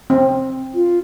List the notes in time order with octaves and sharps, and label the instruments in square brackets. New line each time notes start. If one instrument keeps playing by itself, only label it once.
[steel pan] C4
[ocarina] F4